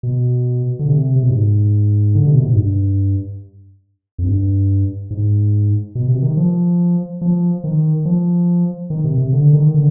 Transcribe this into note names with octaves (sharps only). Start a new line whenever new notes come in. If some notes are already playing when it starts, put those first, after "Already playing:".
B2
D3
C3
C3
B2
G#2
D3
C3
B2
G#2
G2
F2
G2
G#2
B2
C3
D#3
F3
F3
D#3
F3
D#3
C3
C3
D3
D#3
D3